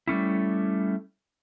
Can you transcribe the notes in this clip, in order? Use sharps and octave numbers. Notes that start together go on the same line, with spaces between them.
G3 A3 C#4 E4